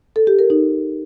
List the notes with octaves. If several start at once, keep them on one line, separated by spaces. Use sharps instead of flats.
A4
G4
A#4
D#4